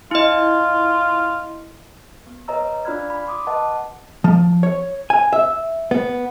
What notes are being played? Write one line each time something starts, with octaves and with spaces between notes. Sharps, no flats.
E4 F4 D#5
B3
B4 C#5 D#5 A#5 E6
D4 F4 D5 B5 F6 G#6
B5
C6 D6 D#6
B4 D#5 F#5 A5
F3
C#5
G#5
E5
B3